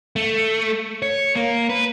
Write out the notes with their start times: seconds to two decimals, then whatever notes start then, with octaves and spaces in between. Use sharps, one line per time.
0.16 A3
1.02 C#5
1.35 A#3
1.70 B4